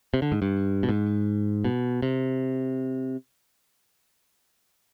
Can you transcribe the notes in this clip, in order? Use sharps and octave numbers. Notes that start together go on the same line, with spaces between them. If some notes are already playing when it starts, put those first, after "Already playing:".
C3
D3
G#2
G2
B2
G#2
B2
C3